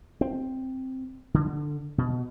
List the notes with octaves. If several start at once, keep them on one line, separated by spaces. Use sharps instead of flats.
C4
D3
B2